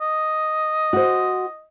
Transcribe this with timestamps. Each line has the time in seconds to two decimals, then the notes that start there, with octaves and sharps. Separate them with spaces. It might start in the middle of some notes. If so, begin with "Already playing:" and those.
0.01 D#5
0.93 F#4 C5